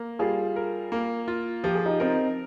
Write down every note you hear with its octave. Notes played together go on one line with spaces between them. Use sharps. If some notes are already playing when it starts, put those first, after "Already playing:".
Already playing: A#3
G3 F4 G#4
A#4
A#3
F4
F3 G4
G#4
D#4 G4
C4 D#4 A#4